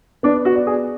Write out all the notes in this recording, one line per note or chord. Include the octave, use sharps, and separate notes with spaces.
B3 D4
F#4
D5
G#4